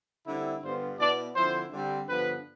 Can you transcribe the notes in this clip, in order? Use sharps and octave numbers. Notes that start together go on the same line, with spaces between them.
D3 G3 C4 E4
G2 D3 G3 B3 F4 C5
B2 B3 E4 D5
D3 F3 C4 E4 C5
D3 G3 C4
G2 D3 F3 B3 B4